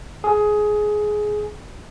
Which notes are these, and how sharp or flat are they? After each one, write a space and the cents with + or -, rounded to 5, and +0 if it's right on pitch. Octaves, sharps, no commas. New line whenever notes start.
G#4 +15